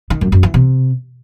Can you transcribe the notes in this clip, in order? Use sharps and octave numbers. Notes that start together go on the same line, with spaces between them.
D#3
F#2
F#2
E3
C3